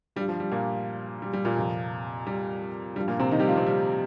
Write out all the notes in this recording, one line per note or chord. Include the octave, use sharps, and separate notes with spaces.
G2 F3 G3
F3
G3
A#2 A#3
G3
G3
A#2 A#3
F2 C3 F3
G3
G2 F3 G3
A#2 A#3
C3 C4
D#3 D#4
G3 G4
F3 F4
C3 C4
G3